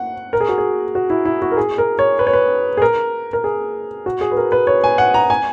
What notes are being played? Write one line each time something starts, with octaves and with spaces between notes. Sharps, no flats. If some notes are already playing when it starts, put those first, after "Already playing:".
Already playing: F#5
A#4
G#4
F#4
G#4
F#4
E4
E4
F#4
A#4
G#4
A#4
C#5
B4
C#5
B4
G#4
A#4
A#4
G#4
F#4
G#4
B4
A#4
B4
C#5
G#5
F#5
A#5
G#5